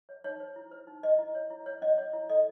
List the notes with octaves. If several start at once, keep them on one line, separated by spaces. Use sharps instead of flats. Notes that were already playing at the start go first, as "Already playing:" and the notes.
C#5
D#4 C#5
C5
E4
C5
D#4
C5 D#5
E4
C#5
E4
C#5
C#4 D#5
C#5
E4
A4 D#5